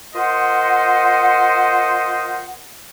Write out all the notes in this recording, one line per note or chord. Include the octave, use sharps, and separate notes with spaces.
F4 A#4 C5 D#5 F#5